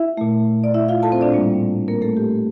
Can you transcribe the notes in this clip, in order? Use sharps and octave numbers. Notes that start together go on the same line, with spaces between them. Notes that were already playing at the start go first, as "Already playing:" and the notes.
Already playing: E4 E5
A#2 A3
D5
E4 E5
F4 F5
A4 A5
C4 C5
D4 D5
A2 G3 A#3
A#3 A#4
A3 A4
G4